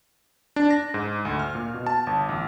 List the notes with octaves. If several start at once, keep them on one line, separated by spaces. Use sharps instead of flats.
D4
A#6
G#2
D2
F6
A#2
B2
A5
G1
A1